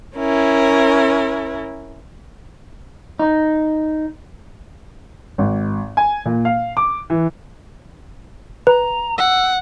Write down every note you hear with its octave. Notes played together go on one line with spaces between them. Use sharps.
C#4 E4 A#4
D#4
G#1
G#5
A#2
F5
D6
E3
B4 A#5
F#5 E6